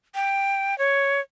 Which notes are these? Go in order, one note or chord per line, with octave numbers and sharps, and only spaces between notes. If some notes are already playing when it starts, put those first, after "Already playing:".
G5
C#5